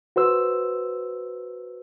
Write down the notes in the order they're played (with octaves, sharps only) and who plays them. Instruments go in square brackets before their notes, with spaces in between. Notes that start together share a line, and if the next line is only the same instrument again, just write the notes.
[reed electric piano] F#4 B4 C5 E6